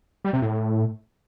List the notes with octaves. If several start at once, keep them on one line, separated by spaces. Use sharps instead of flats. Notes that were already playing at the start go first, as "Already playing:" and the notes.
G3
C3
A2